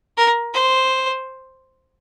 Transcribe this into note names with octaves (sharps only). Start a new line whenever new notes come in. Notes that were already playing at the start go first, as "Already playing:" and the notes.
A#4
C5